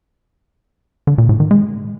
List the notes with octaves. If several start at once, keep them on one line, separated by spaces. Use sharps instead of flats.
D3
A#2
A2
D#3
G#3